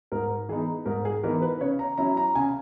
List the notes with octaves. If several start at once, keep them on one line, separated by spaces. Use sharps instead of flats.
G#2 A#4
E3 B3 D#4 G#4
G#2 A#4
G#4
E3 B3 D#4 A#4
B4
C#3 C#5
A#5
F#3 C#4 E4 A#5
A#5
C#3 G#5